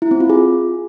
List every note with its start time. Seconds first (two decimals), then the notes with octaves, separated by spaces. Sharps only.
0.02 E4
0.11 C4
0.20 F4
0.30 G#4